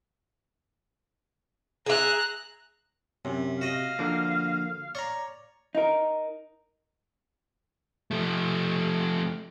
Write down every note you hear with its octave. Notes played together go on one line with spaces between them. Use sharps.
G#4 E5 A#5 F#6
F#2 C3
F#4 D#5 F5
D3 F3 A#3
C#5 D5 A#5
D#4 A#4
F3 A3